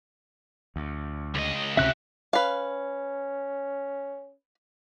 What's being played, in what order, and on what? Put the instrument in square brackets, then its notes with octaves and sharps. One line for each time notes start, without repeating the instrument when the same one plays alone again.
[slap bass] D2
[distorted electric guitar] C#2 D#5
[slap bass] C#2 C3 C#4 [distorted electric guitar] F#4 G4 [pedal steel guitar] E5 F#6
[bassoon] C#4 [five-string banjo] B4 F5